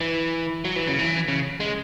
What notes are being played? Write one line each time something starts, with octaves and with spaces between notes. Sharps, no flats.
E3
F#3
E3
C#3
E3
C#3
G#3